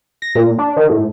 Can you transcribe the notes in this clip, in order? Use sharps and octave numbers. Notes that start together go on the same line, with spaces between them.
A#6
A#2
D4
D#3
A2